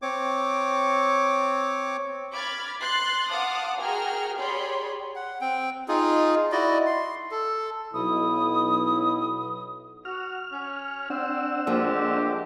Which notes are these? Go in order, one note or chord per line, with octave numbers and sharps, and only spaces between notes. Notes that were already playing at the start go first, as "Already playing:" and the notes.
C4 C#5 D6
B5 D6 F6 G#6 A6
C6 F#6 A6 C7
F5 F#5 A5 D6 D#6 F6
F#4 G#4 A#4 G5 G#5 F6
G4 G#4 C#5 D5 B5 C6
F#5
C4 G5
D#4 F4 G#4
E4 F#4 D5 D#5
C6
A4
B1 E4 D#6
F#4 F6
C#4
C4 D4 F#5 E6
A2 F3 G#3 A#3 G4